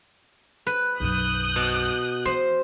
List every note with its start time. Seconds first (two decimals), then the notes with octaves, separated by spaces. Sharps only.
0.67 B4
1.00 B1 F#2 D#6 F#6 G6
1.56 B2
2.25 E3 C5